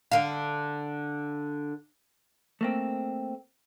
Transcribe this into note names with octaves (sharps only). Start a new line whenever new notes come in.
D3 F5
A3 A#3 C4